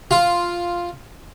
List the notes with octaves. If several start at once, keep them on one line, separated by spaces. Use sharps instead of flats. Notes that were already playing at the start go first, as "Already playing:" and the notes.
F4